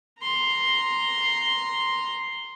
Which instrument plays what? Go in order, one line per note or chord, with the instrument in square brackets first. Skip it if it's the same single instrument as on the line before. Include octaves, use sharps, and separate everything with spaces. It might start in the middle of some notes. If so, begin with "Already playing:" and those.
[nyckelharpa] A#5 C6